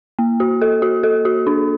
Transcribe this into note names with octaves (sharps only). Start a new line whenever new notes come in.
A#3
F#4
A4
F#4
A4
F#4
D4